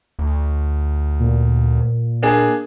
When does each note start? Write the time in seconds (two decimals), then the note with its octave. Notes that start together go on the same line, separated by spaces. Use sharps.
0.19 D2
1.19 A#2
2.22 A#3 D4 G#4